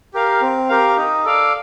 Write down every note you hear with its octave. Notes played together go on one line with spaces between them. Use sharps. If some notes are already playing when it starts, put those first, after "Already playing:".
G4 A#4 F5
C4
G4 A#4 F5
D#4
A4 D5 F5